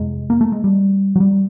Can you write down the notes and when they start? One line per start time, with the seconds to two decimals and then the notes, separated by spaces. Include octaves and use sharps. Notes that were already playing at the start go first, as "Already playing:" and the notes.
Already playing: F2 C3 G#3
0.30 A#3
0.41 A3
0.52 G#3
0.64 G3
1.16 F#3
1.20 G3